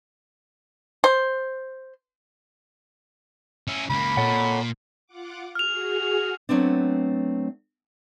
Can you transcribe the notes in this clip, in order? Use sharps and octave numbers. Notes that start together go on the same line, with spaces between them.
C5
C#4 E4
C#2 A#3 B5
A#2 A4 C#5 F#5
F4 F#5 D6
F#4 G#4 F6 F7
F#3 A3 B3 C4 D4